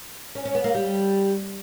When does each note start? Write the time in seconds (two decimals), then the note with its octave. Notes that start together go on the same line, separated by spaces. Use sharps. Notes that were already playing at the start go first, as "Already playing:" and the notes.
0.35 C#4
0.45 C#4
0.55 B3
0.64 A#3
0.75 G3